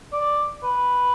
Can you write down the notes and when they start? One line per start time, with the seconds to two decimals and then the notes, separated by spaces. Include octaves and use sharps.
0.13 D5
0.63 B4